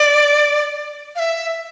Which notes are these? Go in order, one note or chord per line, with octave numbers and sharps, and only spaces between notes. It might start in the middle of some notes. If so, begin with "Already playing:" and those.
Already playing: D5
F5
E5